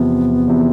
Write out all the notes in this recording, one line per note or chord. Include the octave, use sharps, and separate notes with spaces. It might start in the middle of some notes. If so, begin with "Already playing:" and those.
Already playing: E2 C3 F3 B3
E2 C3 F3